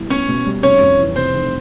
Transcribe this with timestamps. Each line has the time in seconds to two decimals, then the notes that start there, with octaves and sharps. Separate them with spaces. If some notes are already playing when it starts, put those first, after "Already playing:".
Already playing: B2 G3 E4
0.10 B3 C#4 C#5
0.28 B2
0.46 G3
0.63 F1 C#4 C#5
0.81 F2
0.99 E3
1.16 C3 C4 C5
1.34 F1